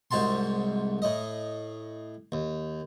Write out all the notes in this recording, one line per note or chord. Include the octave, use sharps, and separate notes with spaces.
C2 G#2 F#4 A5 C6
A2 D#5
D#2